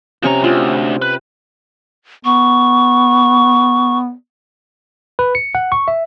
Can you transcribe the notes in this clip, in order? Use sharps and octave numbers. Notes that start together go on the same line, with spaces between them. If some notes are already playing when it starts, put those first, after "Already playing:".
C3 F3 C#4 A#5 C#6
D2 F4
B4
B3 C#6
B4
C#7
F#5
C#6
E5